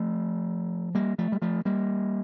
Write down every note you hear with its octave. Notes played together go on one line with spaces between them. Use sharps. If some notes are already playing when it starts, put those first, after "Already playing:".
Already playing: F3 A3
G3 A#3
F3 A3
G3
F3 A3
G3 A#3